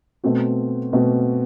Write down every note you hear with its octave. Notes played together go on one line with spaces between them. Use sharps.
B2 A3 C4 F#4
B2 A3 C4 F#4